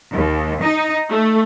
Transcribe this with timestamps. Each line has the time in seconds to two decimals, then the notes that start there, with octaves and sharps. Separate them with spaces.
0.13 D#2
0.63 D#4
1.10 A3